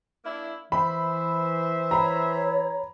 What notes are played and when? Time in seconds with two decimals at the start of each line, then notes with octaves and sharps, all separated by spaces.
0.25 A#3 D4 E4
0.72 E3 C5 E5 B5
1.91 C#5 A#5 B5